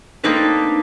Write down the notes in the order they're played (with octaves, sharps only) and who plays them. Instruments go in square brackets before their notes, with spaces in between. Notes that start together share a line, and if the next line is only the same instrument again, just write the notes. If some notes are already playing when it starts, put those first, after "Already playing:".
[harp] A#3 C4 D4 D#4 A4 B4